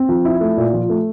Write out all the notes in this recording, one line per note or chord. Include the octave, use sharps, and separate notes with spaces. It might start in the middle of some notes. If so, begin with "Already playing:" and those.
Already playing: C4
F3
E4
A3
A#2
F3
A3